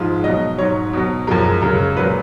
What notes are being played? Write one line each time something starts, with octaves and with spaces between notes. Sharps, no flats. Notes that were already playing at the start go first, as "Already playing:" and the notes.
Already playing: G#2 F3 G#3 F4
B2 F#3 D#5
G#2 F#3 C#5
B2 F#3
F#2 F3 G#3 A#4
F#2 C#3 G#3 A#4
A#2 F#3 B4